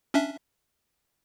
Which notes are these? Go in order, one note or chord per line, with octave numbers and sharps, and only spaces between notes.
C#4 D4 E5